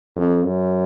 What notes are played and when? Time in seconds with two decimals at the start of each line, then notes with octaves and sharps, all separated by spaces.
0.16 F2
0.44 F#2